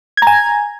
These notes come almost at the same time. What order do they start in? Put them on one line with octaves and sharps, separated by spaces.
G#6 A#5 G#5